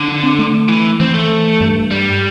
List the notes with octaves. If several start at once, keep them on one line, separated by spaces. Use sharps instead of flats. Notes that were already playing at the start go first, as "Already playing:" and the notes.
Already playing: D3
D4
C4
A3
E3
E3 C4
A3
G2
G3